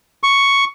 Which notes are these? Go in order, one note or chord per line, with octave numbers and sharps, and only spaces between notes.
C#6